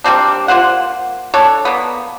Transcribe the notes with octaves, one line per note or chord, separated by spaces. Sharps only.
G3 A#3 C4 D4
A#3 F4 C5 F#5
D4 A4 C#5
A#3 B3